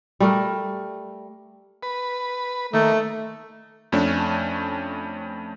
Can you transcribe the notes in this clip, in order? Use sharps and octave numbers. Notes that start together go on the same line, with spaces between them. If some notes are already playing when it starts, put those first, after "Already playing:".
G3 A3 A#4
B4
D#3 A3 A#3
F2 A3 C#4 D4